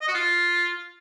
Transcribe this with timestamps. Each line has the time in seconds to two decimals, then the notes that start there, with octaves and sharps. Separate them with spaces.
0.01 D#5
0.08 F#4
0.14 F4